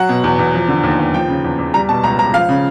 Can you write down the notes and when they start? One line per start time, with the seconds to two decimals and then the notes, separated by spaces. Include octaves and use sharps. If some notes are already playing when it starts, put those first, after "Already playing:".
Already playing: F#3 F#5
0.09 B2
0.24 E2
0.39 E2
0.54 F3
0.68 D3
0.83 D#2
0.99 D#2
1.14 F3 G5
1.28 C#3
1.44 E2
1.59 E2
1.74 G3 A#5
1.88 B2 A5
2.03 C#2 A#5
2.19 C#2 A#5
2.34 F3 F5
2.49 C#3